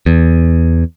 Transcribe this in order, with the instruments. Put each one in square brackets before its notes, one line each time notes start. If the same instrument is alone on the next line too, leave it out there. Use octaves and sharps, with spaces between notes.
[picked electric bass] E2